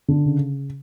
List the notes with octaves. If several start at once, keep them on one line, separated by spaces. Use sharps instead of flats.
D3
C#3